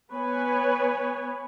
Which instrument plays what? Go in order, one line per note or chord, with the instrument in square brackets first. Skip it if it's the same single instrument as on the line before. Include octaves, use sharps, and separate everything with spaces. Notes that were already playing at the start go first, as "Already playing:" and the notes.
[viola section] B3 B4 C#5 G#5